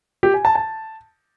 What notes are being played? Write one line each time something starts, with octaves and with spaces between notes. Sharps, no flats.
G4
G#5
A5
A5